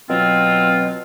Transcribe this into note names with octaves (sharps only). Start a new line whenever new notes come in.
B2 F#3 C4 F4